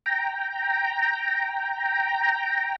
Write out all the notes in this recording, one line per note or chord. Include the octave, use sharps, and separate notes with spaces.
G5 A#5